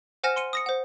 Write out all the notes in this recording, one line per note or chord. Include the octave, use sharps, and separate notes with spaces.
C5 F#5 G#5 F6 A#6 E7
C6 C#7 D#7
D#6 A#6 C#7
C5 F#5